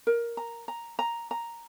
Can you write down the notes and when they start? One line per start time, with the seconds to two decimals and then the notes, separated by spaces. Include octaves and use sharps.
0.07 A#4
0.37 A#5
0.68 A#5
0.99 A#5
1.31 A#5